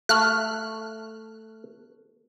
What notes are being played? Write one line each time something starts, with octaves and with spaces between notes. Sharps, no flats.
A3 F6 F#6